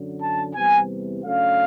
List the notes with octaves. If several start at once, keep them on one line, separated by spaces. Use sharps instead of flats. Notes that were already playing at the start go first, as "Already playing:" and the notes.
Already playing: F#2 D3 F#3
A5
E2 C3 E3 G3 G#5
C#3 F#3 A3 D4 F5